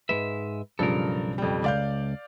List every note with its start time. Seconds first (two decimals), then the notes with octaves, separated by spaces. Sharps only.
0.09 G#2 G#3 B4 E5
0.79 B1 G2 C#3 F3 A4 A#4
1.38 F2 G3
1.64 C#2 D5 F5 G6